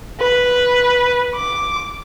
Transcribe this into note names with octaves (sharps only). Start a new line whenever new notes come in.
B4
D6